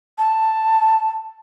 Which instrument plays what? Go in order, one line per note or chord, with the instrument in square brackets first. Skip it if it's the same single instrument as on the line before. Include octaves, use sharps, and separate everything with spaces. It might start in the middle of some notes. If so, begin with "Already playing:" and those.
[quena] A5